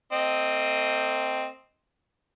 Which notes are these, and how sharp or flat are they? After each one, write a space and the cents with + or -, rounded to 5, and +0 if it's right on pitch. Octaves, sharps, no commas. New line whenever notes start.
A3 +40 C4 +0 D#5 +0